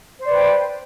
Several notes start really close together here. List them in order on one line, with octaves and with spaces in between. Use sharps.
C5 D5 B4 G5